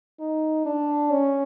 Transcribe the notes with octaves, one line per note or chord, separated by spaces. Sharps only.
D#4
D4
C#4